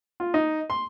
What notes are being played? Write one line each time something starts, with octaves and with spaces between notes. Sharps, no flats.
F4
D#4
C6